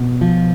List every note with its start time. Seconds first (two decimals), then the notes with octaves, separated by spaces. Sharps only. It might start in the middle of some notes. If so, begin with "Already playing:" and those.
Already playing: B2
0.21 F3